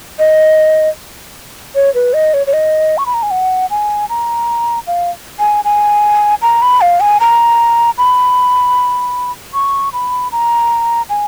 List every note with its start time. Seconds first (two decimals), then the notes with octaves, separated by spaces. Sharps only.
0.19 D#5
1.75 C#5
1.95 B4
2.14 D#5
2.34 C#5
2.47 C#5
2.53 D#5
2.98 C#6
3.06 B5
3.14 A#5
3.23 G#5
3.31 F#5
3.70 G#5
4.09 A#5
4.87 F5
5.39 G#5
5.65 G#5
6.42 A#5
6.62 B5
6.81 F5
7.00 G#5
7.20 A#5
7.98 B5
9.54 C#6
9.93 B5
10.32 A#5
11.10 G#5